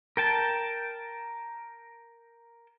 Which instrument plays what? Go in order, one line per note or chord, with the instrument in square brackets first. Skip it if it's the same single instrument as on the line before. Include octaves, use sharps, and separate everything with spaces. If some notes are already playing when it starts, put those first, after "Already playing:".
[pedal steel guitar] A#4 G5 A5